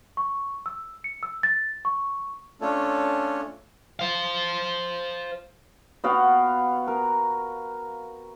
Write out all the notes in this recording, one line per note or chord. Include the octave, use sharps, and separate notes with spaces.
C#6
E6
C#7
E6
A6
C#6
A3 C#4 D4 F4 A4 C#5
C5 F5
B3 F#4 F5 G5
A#4